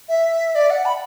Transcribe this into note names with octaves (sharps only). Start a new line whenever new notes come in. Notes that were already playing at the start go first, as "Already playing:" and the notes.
E5
D5
F#5
B5